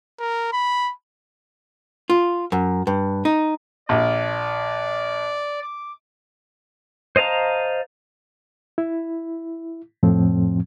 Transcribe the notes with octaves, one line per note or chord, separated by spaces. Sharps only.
A#4
B5
F4
F#2
G2
D#4
A#1 D5
D6
C5 D#5 F5 A5 A#5
E4
F2 A2 F3 C4